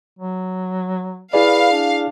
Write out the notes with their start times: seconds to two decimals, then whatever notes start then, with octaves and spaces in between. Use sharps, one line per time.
0.19 F#3
1.33 E4 G#4 B4 D5 F5
1.72 D4